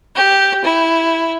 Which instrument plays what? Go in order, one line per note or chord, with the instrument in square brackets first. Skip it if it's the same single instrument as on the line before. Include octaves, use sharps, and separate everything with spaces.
[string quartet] G4
E4